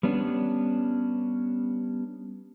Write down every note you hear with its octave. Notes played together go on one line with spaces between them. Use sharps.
G3 B3 C#4 D4